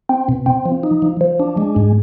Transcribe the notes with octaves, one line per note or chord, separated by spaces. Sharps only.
C4
B2
C4
F3
D#4
F3
F3
D4
G#3
G#2